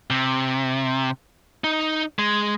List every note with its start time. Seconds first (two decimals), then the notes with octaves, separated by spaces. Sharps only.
0.10 C3
1.64 D#4
2.19 G#3